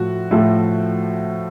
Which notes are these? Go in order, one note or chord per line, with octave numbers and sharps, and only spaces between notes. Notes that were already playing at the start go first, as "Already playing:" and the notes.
Already playing: A2 F3 A3 F#4
A2 F3 A3